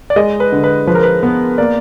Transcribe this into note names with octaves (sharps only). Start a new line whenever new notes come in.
D5
G#3 D#5
B4
D3
B4
F3 B4
A#4
B4
B3
A#3 D5